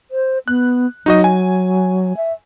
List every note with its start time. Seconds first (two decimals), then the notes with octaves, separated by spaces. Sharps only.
0.11 C5
0.48 B3 F#6
1.06 F#3 D#4 F#4 D#5
1.24 G#5
2.17 E5